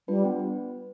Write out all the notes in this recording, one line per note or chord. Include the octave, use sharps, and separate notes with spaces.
G3 D4 F4 B4
B3
B4